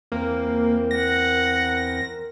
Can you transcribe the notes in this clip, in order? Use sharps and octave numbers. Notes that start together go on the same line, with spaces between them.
E2 A#3 C4 A#4
F#5 A#6